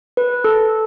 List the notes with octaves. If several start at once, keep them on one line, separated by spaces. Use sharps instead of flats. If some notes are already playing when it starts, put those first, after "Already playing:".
B4
A4